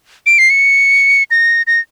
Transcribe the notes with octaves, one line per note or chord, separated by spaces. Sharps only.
D7
C7
C#7
A#6
A#6